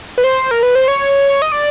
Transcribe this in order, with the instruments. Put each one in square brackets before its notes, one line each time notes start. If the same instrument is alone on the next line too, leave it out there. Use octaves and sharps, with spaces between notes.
[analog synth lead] B4
C5
A#4
B4
C5
C#5
D#5
D5